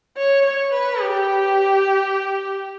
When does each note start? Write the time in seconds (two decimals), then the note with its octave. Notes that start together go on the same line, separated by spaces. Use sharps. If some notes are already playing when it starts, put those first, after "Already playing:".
0.17 C#5
0.46 C#5
0.73 B4
1.01 G4